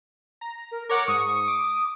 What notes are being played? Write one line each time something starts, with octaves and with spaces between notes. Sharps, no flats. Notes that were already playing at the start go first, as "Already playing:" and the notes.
A#5
A#4
A#4 C#5 F#5 D6
G#2 C#6 D#6
D6